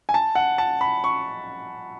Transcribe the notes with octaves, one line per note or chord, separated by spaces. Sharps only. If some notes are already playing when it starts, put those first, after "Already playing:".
G#5
A5
F#5
A5
B5
C#6